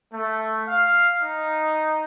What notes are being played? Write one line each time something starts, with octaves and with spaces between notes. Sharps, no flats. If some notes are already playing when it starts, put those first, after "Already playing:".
A3
F5
D#4